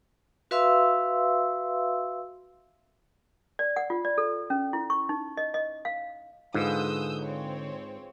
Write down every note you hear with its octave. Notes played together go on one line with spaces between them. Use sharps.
F#4 B4 E5 F5 C6 E6
D5
F#5
F4
D5
A4
C#4
E4
C#6
D#4
D#5
D#5
F5
G#2 D3 F4 G#4 B4 D#6 E6 G6
C4 C#5